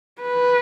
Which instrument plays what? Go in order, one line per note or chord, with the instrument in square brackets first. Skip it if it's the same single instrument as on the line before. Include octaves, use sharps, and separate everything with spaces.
[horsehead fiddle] B4